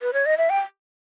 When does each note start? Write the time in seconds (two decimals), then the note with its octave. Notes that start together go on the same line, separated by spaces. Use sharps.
0.01 B4
0.14 C#5
0.26 D#5
0.38 E5
0.50 G5